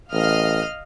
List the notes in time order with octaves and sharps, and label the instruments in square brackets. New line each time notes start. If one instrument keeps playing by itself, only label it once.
[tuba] A1 [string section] D#5 F5 F6